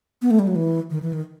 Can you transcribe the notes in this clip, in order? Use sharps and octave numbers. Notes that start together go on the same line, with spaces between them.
B3
A3
G3
F#3
E3
D#3
E3
D#3